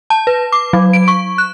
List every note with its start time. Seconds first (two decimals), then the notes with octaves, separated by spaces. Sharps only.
0.10 A5
0.27 B4
0.52 D6
0.73 F#3
0.93 D7
1.08 C#6
1.38 F#6